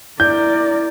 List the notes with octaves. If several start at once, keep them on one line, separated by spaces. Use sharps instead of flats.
E4 A#4 D5 G6